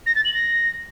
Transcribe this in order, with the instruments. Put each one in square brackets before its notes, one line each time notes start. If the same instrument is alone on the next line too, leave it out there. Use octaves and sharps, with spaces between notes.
[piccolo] A#6
A6
F#7
A#6